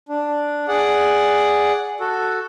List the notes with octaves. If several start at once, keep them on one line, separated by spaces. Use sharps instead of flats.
D4
G#4 D5 F#5
F#4 A4